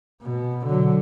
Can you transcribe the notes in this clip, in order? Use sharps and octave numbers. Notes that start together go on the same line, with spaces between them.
B2
D3 F#3